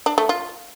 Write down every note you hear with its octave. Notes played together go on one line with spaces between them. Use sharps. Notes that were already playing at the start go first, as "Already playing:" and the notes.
D4
A3
F4